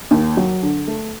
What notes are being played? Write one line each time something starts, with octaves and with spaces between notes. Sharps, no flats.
D#2
F#3
D3
A3